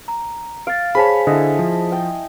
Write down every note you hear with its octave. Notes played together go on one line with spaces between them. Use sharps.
A#5
F5 A6 D7
G#4 C5 C#5 G#5 A5 B5 B6
D3 E4 D#5
F3
G5